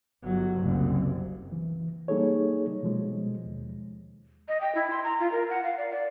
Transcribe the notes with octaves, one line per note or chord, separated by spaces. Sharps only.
G1 F#3
F#1 C2
E3
G3 A#3 D#4 G#4 A4 C#5
B2 F3 G#3
D#2
D#5
G5
E4
C6
A#5
F4
A#4
F#5
F5
D5
D5